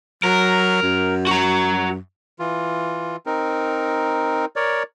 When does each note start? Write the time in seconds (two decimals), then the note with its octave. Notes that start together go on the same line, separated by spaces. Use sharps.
0.24 F#3 A#4
0.83 F#2
1.27 F#4 A#5
2.39 E3 F4
3.26 C4 D#4 A#4
4.56 A#4 C#5 D5